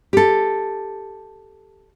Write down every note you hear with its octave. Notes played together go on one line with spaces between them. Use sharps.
G4 A4